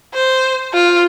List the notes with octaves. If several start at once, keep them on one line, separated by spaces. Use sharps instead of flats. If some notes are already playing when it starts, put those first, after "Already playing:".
C5
F4